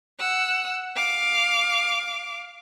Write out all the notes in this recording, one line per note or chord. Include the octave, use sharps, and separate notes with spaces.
F#5 E6
F5 D6